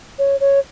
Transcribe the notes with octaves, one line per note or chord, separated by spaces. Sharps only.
C#5
C#5